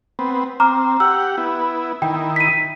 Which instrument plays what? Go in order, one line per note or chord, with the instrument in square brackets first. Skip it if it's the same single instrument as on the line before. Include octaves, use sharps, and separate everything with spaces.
[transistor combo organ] B3 C4
[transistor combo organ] C4 [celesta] A#5 D6 F6
[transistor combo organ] G4 F#5 [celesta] E6
[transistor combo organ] B3 E4
[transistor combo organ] D#3 E4 [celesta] G5
[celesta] B6 D#7